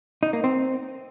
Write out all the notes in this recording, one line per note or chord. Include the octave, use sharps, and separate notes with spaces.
D#4
A#3
C4